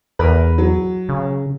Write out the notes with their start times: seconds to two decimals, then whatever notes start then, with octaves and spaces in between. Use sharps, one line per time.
0.19 E2 A#4 B4
0.58 F#3
1.09 C#3